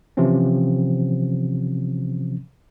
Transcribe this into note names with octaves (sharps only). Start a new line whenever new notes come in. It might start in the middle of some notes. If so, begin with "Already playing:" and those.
C3 E3 F3 C4 C#4